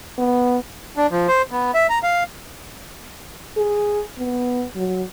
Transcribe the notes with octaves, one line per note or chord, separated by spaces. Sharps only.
B3
D4
F3
C5
B3
E5
A#5
F5
G#4
B3
F#3